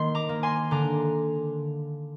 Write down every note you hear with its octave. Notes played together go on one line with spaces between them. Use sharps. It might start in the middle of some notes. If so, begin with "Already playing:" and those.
Already playing: D#3 A#3 C6
A#5 D6
A#3
G#5 C6
D3 A#5 D6